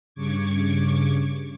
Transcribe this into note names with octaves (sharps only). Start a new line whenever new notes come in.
G2 C#3 C#6 D6 G#6